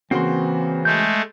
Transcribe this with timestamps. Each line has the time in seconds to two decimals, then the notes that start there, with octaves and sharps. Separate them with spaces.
0.11 C#3 E3 A#3 C4 F#4 C6
0.85 G#3 A3 G6